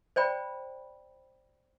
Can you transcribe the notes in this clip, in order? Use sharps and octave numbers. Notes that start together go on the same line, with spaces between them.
C5 D5 G5 B5